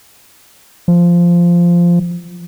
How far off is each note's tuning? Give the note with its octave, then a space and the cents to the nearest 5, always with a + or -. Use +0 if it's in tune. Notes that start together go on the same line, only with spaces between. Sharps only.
F3 -10